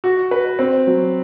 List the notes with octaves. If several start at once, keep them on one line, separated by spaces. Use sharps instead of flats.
F#4
B4
C4
F#3